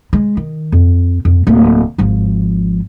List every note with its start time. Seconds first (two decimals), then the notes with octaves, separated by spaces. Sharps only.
0.13 G#3
0.37 D#3
0.72 F2
1.25 F2
1.47 D1 A#3
1.98 G#1 F3